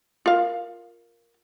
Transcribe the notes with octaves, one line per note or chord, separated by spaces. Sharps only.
F4 A#4 F5